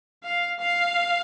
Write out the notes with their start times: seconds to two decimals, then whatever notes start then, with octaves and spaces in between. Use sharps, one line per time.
0.24 F5
0.60 F5